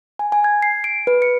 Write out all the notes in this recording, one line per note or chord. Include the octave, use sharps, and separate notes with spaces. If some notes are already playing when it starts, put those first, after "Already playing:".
G#5
G#5
G#6
C7
D7
B4
C#7